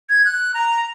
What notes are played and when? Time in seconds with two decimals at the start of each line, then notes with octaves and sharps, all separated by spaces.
0.10 G#6
0.25 F#6
0.54 A#5